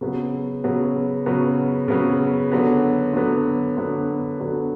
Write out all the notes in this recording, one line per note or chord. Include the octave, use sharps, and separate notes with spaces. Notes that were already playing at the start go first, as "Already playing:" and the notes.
C#3 F#3 B3
C#3 F#3 B3
C#3 F#3 B3
C#3 F#3 B3
D3 F#3 B3
D3 F#3 B3
D3 F#3 B3
D3 F#3 B3